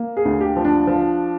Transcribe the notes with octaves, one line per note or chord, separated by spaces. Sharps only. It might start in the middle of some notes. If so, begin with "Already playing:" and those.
Already playing: A#3
G#4
D2
G4
F3
D4
F3